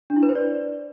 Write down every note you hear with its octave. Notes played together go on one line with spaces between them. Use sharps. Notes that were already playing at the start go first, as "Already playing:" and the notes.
D4
E4
B4
C5
D5